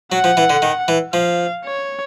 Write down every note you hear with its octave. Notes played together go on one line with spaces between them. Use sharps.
F#3 F#5
F3
E3
D3
D#3
E3
F3 F5
C#5